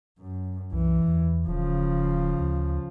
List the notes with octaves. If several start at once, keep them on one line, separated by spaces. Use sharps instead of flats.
F#2
C2 E3
E2
D#1 C#3 F3
D2